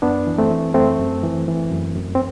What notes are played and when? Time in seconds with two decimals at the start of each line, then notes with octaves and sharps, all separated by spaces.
0.02 F#2 B3 D4
0.27 E3
0.38 A3 C4
0.51 E3
0.74 F#2 A3 C4
0.99 F#2
1.23 E3
1.48 E3
1.71 F#2
1.95 F#2
2.15 C4